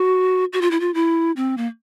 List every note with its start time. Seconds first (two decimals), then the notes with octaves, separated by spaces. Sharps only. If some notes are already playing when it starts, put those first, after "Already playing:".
Already playing: F#4
0.53 F#4
0.61 F4
0.71 E4
0.80 F4
0.94 E4
1.36 C4
1.57 A#3